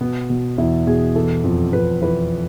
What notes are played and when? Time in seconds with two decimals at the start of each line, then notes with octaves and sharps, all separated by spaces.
0.01 B2 B3
0.30 B2
0.58 E2 E4
0.87 B2 G#4
1.15 E3 A4
1.44 F2
1.73 F2 B4
2.02 E3 B4